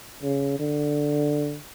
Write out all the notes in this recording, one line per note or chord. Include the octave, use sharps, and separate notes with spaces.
C#3
D3